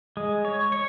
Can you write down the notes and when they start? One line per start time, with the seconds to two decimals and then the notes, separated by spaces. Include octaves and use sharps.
0.17 G#3
0.45 C#5
0.72 C#5